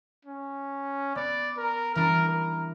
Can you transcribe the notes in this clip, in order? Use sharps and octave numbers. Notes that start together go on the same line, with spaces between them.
C#4
B3 D5
A#4
E3 G3 D4 A#4
A#4